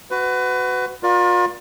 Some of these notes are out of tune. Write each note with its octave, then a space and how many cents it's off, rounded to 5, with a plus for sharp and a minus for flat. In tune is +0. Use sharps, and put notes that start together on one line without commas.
F#4 +5 B4 +25
F4 +35 A#4 +40 D5 +0